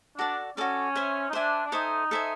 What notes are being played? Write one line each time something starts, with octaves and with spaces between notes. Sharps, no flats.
D4 F#4 A4 D5
C#4 F#4 A4 D5
C5 E5 G#5
D#4
D4 C5 E5 G#5
D4
D#4 A4 C5 E5 G#5
A4 C5 E5 G#5